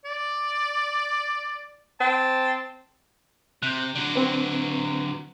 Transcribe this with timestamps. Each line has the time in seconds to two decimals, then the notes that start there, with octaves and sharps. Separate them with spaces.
0.05 D5
2.01 C4 A5
3.62 C3 F#6 G6
3.95 D3 F#3
4.15 C4 B4